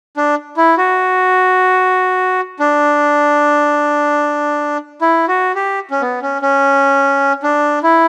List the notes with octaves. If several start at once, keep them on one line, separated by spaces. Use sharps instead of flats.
D4
E4
F#4
D4
E4
F#4
G4
C#4
B3
C#4
C#4
D4
E4